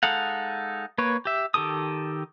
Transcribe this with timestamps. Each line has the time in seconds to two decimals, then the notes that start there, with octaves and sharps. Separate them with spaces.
0.03 G#3 D#4 A4 F5 F#5
0.98 A#3 B4 C#5
1.25 G4 E5
1.54 D#3 G4 A4 D#6